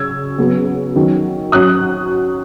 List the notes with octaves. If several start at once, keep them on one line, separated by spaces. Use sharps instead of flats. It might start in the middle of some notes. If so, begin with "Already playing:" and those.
Already playing: C#3 F#3 C#4 E6 G#6
C#3 F#3 B3
D#3 F#3 C#4
F#3 C#4 D#6 F#6